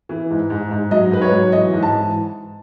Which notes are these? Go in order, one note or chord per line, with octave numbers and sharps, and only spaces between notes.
E3
G#2
G#2
G#2
F#3 D#5
G#2 B4
C#5
F#3
E3 D#5
G#2
A5
E3